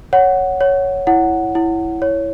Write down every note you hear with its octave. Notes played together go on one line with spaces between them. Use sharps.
C#5 F#5
C#5
E4 F#5
E4
C#5